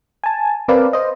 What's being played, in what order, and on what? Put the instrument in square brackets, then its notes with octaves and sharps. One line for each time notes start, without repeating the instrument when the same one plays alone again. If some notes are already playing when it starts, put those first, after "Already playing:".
[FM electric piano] G#5 A5
C4 A#4 B4 D5 F5
C5 D#5